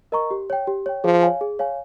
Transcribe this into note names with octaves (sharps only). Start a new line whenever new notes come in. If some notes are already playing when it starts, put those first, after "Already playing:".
A#4 D#5 A#5 C#6
G4
C#5 G5
G4
C#5 G5
F3 G#4
C#5 F5 G#5
G#4
C#5 F5 G#5